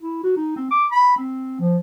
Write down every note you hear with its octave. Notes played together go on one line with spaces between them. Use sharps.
E4
F#4
D#4
C4
D6
B5
C4
F3